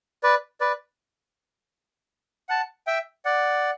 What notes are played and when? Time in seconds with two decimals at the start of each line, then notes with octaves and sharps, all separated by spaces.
0.23 B4 D5
0.61 B4 D5
2.49 F#5 A5
2.87 E5 G5
3.25 D5 F#5